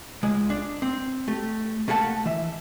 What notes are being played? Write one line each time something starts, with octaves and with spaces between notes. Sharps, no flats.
C#2 G#3
D4
C4
A3 G4
A3 A#3 G4 F#5 A5
E3 E5